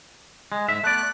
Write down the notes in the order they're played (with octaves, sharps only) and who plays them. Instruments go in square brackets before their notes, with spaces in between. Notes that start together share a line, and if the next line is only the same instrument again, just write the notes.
[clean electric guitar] G#3
G#2 E5
[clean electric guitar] A3 B3 D5 [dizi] F#6